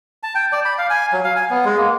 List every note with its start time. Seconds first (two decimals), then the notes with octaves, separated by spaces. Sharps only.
0.23 A5
0.35 G5
0.52 D5
0.65 B5
0.78 F5
0.90 G#5
1.13 F#3
1.24 F5
1.36 G#5
1.50 B3
1.65 G#3
1.78 A#3